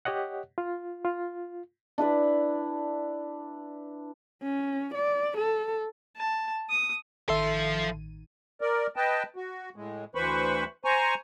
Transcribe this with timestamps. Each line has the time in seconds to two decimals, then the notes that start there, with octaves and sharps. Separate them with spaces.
0.05 G4 C#5 D#5 F#5
0.58 F4
1.05 F4
1.98 D4 E4 B4 D5
4.43 C#4
4.95 D5
5.38 A4
6.17 A5
6.70 D#6
7.28 A1 D#3 F3 A4 E5 C6 D#7
8.61 A#4 D5
8.96 B4 D#5 G5 A5
9.36 F#4
9.76 A2 G#3
10.15 D2 E3 B4 C5 B5 C#6
10.85 C5 G#5 A#5 C#6